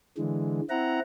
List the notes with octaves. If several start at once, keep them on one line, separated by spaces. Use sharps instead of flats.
D3 E3 G#3
C4 E4 F#5 A#5